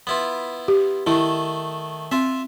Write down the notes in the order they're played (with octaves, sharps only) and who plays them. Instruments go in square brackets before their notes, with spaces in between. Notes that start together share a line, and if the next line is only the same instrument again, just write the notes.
[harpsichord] B3 E4 F4
[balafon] G4
[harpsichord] D#3 A3 [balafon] E4
[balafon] C4 [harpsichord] F4 E5